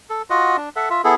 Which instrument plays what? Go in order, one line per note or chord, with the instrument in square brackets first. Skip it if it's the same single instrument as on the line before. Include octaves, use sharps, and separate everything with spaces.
[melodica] A4
F4 F#4 D#5 F#5
D4
A4 E5 F#5
F4 E5
B3 E4 G#4 A4